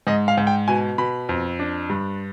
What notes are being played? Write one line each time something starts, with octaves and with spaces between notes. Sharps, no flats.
G#2 D#5
F5
G#2
G5
B2 G#5
B2 B5
F2
D4
G2